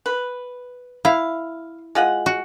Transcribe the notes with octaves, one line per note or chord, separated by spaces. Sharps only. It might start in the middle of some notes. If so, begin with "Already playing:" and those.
B4
E4 F5
G#3 F4 F#5
F#4